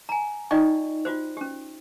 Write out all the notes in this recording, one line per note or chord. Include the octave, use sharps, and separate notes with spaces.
G#5 A#5
D#4 F4 D5 D#5 G5 C#6
F4 F#4 C5
C#4 G4